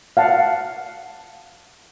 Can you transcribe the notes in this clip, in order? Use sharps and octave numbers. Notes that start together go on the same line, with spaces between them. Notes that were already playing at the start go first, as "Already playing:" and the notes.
F5 F#5 A5